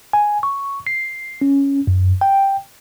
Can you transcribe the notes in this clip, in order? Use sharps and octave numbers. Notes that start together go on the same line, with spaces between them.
G#5
C#6
C7
C#4
F#2
G5